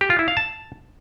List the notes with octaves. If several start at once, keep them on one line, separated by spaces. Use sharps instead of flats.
G4
F4
E4
F5
A5